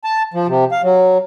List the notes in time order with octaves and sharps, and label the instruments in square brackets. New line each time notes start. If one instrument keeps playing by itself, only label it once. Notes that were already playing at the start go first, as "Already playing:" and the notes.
[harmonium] A5
F3
C3
F5
F#3